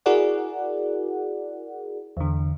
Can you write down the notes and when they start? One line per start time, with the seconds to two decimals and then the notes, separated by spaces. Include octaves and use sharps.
0.06 E4 F#4 G#4 A#4 D5 F#5
2.17 E2 D3